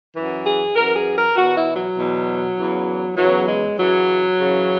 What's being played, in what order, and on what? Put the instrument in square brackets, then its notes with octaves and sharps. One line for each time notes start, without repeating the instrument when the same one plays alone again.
[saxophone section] F#2 E3
G#4
F#2 E3 A#4
G#4
A#4
E2 B2 F#4
E4
F#3
E2 B2
E2 C#3 E3
E2 C#3 E3 F#3
G#3
F#2 C#3 E3 F#3
F#2 C#3 E3